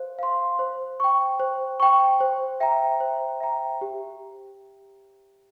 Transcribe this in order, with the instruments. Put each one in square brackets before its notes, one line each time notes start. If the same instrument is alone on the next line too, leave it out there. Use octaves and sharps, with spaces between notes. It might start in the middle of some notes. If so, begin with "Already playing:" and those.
Already playing: [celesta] C5 F5
F5 C6
C5
G5 C#6
C5
G5 C#6
C5
E5 G5 A#5
C5
E5 G5 A#5
G4